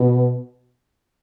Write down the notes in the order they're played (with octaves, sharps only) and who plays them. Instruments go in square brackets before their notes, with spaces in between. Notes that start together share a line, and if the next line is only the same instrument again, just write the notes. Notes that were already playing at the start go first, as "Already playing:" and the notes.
Already playing: [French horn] B2